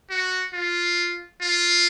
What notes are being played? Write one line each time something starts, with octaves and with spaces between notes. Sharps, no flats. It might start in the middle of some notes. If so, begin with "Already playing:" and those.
F#4
F4
F4